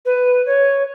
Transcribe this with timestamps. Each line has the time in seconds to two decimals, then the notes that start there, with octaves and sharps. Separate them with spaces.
0.05 B4
0.46 C#5